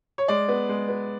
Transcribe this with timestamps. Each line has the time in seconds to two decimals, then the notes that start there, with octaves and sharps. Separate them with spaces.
0.18 C#5
0.28 G#3 D5
0.49 B3
0.69 G#3
0.88 B3